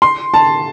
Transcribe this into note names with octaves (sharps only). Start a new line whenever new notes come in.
C6
A5